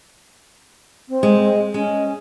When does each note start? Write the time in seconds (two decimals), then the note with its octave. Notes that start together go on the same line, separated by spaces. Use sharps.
1.09 C4
1.23 G#3
1.74 G#3 C#4